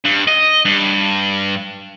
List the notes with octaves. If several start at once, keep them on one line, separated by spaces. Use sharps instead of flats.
G2
D#5
G2